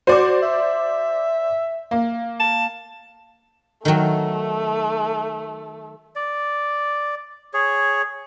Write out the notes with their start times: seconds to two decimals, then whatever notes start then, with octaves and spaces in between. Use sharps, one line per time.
0.07 F#4 C5 D5 D6
0.42 E5
1.91 A#3
2.40 A5
3.85 D#3 F#3 A3
6.16 D5
7.54 G#4 C#5